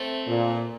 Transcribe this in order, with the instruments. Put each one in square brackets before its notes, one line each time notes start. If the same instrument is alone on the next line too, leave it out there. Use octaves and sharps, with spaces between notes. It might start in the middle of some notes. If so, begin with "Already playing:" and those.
Already playing: [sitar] A3 C4
[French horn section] A#2